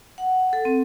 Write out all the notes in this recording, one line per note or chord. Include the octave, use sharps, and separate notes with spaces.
F#5
A4
C4